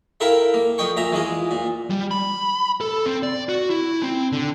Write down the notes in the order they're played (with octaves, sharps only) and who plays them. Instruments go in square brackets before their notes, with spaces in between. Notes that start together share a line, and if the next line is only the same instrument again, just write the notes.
[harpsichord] E4 A4 A#4 E5 F5 G5
A#3
F2 D#5 G5 C#6
A#2 E5 A#5
E3 G#3 F4
A#2
[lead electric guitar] G3
B5
A4
C4
D5
F#4
E4
C4
D3